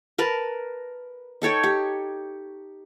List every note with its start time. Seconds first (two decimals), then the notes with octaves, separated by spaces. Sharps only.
0.18 A#4 B4 A5
1.42 D#4 A4 C#5 G5
1.63 G4